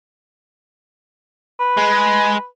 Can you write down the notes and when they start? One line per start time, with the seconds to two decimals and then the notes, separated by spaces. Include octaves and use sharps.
1.59 B4
1.77 G#3